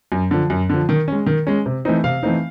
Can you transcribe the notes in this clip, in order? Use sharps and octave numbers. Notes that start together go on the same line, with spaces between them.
F#2
D3 F3
F#2
D3 F3
D#3
G#3 C#4
D#3
G#3 C#4
C3
E3 A3 C4 D#4
C3 F5
E3 A3 C4 D#4